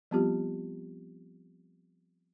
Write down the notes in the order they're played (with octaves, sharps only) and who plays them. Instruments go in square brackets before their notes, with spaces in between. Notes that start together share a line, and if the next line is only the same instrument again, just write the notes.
[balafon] F3 G3 B3 C4 F4 G4